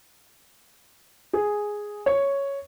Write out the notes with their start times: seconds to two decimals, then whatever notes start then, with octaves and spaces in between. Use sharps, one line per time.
1.33 G#4
2.06 C#5